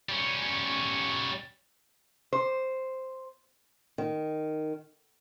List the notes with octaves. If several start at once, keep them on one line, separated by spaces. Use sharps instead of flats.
G3 C#4
C5
D#3